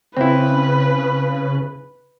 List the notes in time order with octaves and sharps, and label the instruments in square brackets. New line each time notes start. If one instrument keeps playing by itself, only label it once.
[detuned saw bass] C#3 [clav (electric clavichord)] C4 E4 [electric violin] B4